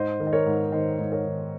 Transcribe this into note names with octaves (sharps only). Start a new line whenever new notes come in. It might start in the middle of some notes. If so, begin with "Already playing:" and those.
Already playing: G#2 C5 D#5
D#3
D#5
A#4 C#5
G#2
D#3 C5 D#5
G#2
A#4 C#5
D#3